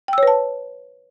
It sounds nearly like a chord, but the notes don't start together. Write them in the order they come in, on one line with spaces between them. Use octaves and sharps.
G5 E6 C#5 B4 A5